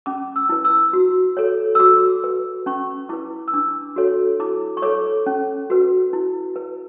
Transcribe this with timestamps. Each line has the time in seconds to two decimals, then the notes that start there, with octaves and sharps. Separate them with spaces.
0.06 C#4 D6
0.36 E6
0.49 E4 B4
0.65 E6
0.93 F#4
1.37 A4 C#5
1.75 E6
1.79 F#4 D6
2.24 B4
2.66 C#4 C#6
3.09 E4 B4 D6
3.48 E6
3.54 D4 D6
3.96 F#4 A4 C#5
4.40 E4 D6
4.77 C#6
4.82 A4 C#5 D6
5.26 C#4
5.70 F#4 B4
6.13 E4
6.56 B4